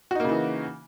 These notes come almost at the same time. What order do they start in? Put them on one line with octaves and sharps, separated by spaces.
F#4 D#4 A#3 C#3 E3